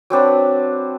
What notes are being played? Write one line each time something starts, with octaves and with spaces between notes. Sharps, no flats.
F#3 C4 D4 B4